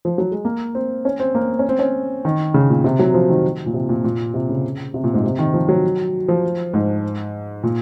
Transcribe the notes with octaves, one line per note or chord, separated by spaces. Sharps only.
F3
F#3
G#3
A#3
C4
C#4
C4
A#3
C#4
C4
C#4
D#3
C#3
A#2
C3
F#3
F3
D#3
A#2
C3
A#2
A#2
C3
C#3
C3
A#2
G#2
C3
D#3
F3
F#3
F3
G#2
A#2